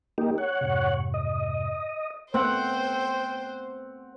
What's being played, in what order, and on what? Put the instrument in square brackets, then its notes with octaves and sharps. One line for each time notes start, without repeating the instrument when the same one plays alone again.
[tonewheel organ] A#3 D#4 G4
C#5 F#5
[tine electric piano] F2 G#2 C3
[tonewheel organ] D#5
[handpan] A3 B3 [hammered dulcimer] C4 F#5 [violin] C5 [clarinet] G5